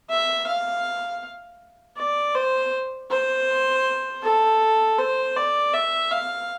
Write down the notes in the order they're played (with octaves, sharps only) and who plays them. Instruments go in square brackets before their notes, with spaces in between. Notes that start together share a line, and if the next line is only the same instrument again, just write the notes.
[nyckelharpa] E5
F5
D5
C5
C5
A4
C5
D5
E5
F5